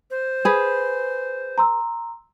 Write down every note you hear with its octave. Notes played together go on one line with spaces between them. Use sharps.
C5
G#4 B4
A#5 C6 E6